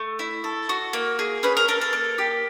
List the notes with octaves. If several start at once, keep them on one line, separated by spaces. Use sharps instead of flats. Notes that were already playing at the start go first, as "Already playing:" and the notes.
Already playing: A3
E4
A4
F#4
A#3
G#4
C#4 B4
A#4
A4 A#4
A4
A#3
G4